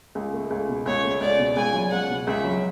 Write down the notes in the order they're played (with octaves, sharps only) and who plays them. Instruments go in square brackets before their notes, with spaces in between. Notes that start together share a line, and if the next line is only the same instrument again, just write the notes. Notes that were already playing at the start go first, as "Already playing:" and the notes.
[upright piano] C#2
A3
C#2
B2
[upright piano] C#2 [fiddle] C#5
[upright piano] A3
[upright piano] C#2 [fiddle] D5
[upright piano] B2
[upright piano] C#2 [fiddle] G#5
[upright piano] F#3
[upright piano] C#2 [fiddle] F#5
[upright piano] B2
[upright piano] C#2 [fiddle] E5
[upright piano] F#3